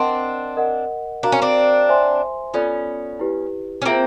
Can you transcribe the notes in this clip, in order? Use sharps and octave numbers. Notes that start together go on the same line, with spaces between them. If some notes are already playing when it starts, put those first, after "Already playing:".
Already playing: C4 D4 A#4 D#5 F#5 A5 C6
A#4 D#5 F#5
D4 F#4 A#4 D5 F5 A#5
C#4
C4 D4
C5 E5 G#5 C6
B3 C#4 F4 A4 D5
E4 G4 B4
C#4
A#3 C4 F4 G#4 C5 E5 G5